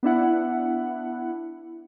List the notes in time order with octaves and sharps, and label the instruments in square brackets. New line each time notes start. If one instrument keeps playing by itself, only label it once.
[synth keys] B3 D4 E4 F#5